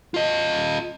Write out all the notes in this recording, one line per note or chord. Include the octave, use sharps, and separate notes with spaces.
F4 D#5